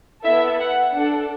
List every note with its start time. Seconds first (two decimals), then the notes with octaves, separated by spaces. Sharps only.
0.24 B3 E4 A4 E5
0.59 F#5
0.94 D4 A4 F#5